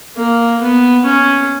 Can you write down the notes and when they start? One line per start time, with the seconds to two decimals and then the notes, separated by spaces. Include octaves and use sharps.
0.17 A#3
0.61 B3
1.05 C#4